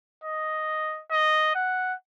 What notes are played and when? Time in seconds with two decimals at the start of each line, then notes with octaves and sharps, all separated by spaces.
0.24 D#5
1.11 D#5
1.55 F#5